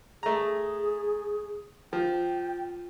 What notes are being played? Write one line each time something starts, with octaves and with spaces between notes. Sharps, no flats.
A3 G#4 A#5
F3 G5